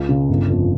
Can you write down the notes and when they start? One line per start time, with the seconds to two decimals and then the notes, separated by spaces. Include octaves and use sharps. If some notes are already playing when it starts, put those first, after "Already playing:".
Already playing: C#2
0.09 C#3
0.29 G1
0.50 F2